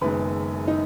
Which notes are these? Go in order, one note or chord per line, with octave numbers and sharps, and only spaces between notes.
F#1 F#2 D#3 G#3 B3 B4
D#4